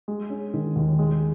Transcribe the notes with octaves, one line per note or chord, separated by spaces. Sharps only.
G#3
C#4
D#3
D#2
G#3